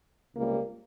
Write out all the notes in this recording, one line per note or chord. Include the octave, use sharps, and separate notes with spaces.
C#2 C3 G3 A#3